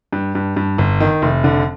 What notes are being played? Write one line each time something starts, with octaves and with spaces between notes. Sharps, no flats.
G2
G2
G2
G1
D#3
F1
D3